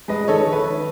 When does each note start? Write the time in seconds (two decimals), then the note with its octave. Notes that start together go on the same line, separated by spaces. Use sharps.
0.08 G#3 B4 D#5
0.28 D#3 A4 C#5
0.46 D#3
0.52 B4
0.65 D#3